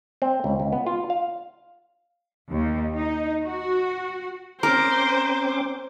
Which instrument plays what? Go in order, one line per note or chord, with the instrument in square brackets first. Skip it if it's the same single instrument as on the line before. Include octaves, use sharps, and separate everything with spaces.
[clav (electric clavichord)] C4
C#2
C#2
B3
F4
F5
[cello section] D#2
D#4
F#4
[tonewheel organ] C4 C#4 D6 [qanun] A#4 [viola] C5 [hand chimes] A#5